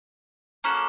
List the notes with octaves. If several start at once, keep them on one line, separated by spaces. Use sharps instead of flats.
A#3 C#4 F#4 A4